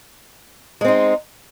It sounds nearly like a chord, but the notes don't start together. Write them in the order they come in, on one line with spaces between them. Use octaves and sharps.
G#3 C4 D#4